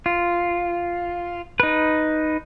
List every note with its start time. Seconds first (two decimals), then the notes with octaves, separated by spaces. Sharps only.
0.06 F4
1.60 D#4 B4